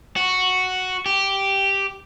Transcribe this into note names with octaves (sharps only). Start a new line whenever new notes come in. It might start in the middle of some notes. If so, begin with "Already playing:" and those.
F#4
G4